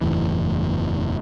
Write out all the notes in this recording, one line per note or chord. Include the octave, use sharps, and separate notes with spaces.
F#1 E2 A2 E3